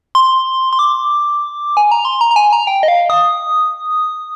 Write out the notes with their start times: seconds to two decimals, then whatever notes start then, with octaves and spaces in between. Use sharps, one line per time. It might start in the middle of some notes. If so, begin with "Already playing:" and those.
0.15 C6
0.73 C6
0.79 D6
1.77 G#5
1.91 A#5
2.05 C6
2.21 A#5
2.31 A#5
2.36 G#5
2.53 A#5
2.67 G5
2.83 D#5
2.88 F5
3.10 D#6